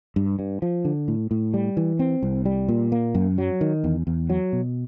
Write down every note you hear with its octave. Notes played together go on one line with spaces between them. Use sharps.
G2
G2
F3
D3
A2
A2
G3
E3
C4
C2
G3
A#2
A#3
F#2
F#3
D#3
E2
E2
F#3
B2